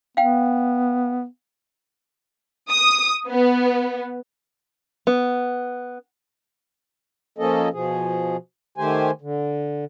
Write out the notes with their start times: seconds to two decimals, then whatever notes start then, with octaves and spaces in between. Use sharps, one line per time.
0.17 B3 F5 G5
2.70 D#6
3.28 B3
5.07 B3
7.38 F3 A#3 C#4 A4 D#5
7.73 B2 F3 G#4
8.78 D#3 A3 G4 C5 G#5
9.21 D3